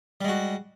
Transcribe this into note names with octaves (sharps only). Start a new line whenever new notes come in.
G3 G#3 F#4